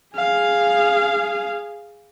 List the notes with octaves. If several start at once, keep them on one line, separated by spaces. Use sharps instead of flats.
G#4 F5